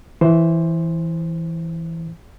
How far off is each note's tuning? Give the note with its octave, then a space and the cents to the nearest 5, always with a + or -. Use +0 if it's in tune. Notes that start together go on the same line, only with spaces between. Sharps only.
E3 +0 C5 +10